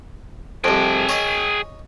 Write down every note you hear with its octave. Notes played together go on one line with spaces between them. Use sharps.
C2 F2 G#4 G5
C#5 D#5